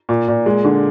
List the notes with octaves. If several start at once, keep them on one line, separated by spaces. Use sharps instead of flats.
A#2
A#2
G#3
D3